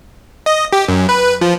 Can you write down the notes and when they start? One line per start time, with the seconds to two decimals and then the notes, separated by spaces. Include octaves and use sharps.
0.46 D#5
0.73 G4
0.88 F#2
1.09 B4
1.41 F3